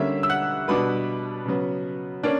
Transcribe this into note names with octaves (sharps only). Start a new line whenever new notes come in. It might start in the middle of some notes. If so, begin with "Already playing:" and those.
Already playing: D3 G3 A#3 C#4 E5 E6
E6
F#5 F#6
B2 G3 B3 D4 B4 B5
C#3 F#3 B3
A#3 C#4 D4 D5